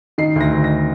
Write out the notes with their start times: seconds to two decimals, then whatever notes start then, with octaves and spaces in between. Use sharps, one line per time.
0.18 D#3 C7
0.36 D2 A#6
0.53 D2
0.64 A#6